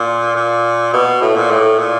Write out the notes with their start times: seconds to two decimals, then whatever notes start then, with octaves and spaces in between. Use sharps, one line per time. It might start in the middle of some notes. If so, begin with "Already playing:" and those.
Already playing: A#2
0.36 A#2
0.93 B2
1.22 A2
1.36 A#2
1.51 A2
1.79 A#2